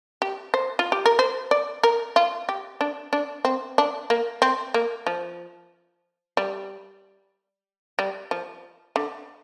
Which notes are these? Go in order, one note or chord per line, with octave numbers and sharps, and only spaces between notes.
G4
C5
F4
G4
A#4
C5
D5
A#4
F4
G4
D4
D4
C4
D4
A#3
C4
A#3
F3
G3
G3
F3
D3